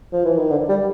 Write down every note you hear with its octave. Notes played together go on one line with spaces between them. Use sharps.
F3
E3
D#3
D3
G3